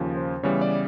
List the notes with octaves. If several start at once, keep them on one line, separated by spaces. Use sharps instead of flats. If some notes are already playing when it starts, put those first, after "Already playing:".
Already playing: D#2 C#3 F3
C5
C#3 E3 G3 B3 C#5
D5